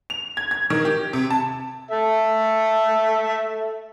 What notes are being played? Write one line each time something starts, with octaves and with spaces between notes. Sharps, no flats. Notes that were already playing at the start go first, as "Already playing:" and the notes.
F7
G#6
G#6
D#3
G4
C3
A5
A4 E5